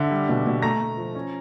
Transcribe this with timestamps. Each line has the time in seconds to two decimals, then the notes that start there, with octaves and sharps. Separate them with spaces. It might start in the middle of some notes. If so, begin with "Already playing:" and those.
Already playing: D3 E5
0.11 G3
0.29 B2
0.46 B2
0.62 A3 A#5 A#6
0.81 A3
0.97 F3
1.15 C#4